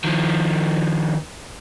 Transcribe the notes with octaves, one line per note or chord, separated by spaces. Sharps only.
D#3 F3